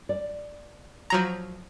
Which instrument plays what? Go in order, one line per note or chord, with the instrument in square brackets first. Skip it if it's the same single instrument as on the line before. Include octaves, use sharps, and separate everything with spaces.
[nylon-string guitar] D5
[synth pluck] F3 F#3 A#5